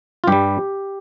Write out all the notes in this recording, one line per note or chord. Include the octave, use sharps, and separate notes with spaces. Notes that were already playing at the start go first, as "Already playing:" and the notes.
F4
G2 G3 G4